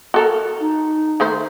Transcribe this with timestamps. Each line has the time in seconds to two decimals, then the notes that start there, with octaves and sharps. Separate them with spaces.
0.14 F#4 A4 A#4
0.60 D#4
1.20 D#3 A3 C5